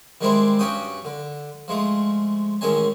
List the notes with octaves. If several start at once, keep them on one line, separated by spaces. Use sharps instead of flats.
D#3 G3 G#3 C4 D4 E4
G2 C#4 F#4 G4 G5 D#6
D3
F3 G#3 A3
A1 D#3 G#3 C#4 G#5 A5